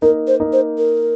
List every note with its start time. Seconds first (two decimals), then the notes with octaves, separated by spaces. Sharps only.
0.02 A#3 D#4 A#4
0.27 C5
0.40 A#3 D#4
0.53 C5
0.78 A#4